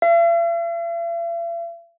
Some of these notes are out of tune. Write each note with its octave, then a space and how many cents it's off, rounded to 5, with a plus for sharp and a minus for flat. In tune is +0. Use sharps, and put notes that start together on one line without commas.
E5 +45